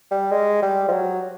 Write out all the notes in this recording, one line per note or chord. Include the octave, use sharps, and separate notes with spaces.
G3
G#3
G3
F3
F#3